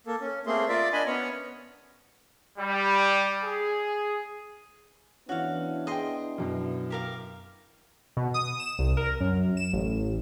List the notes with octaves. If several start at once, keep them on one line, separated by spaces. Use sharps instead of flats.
A#3 A4
C#4
A3 A#3 C4 G#4 C6
F4 A#4 D5 E5
D4 D#5 G#5 B5
B3 C#4 C#5
G3
G#4
E3 B3 C#4 D4 E4 F#4 F5
G#4 D#5 G5 C6
F#2 B2
G4 A#4 F5
B2
D#6
E7
C2
A#4
F#2
E7
A1